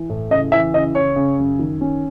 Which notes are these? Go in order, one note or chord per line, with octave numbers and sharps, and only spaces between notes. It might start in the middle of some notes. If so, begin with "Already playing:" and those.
Already playing: E3
A2
C#3 D#5
E3 E5
C#3 D#5
C#3 C#5
C#3
F#2
D#3
C#4